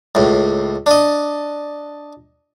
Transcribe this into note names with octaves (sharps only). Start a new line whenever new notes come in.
C#2 A2
D4 D#5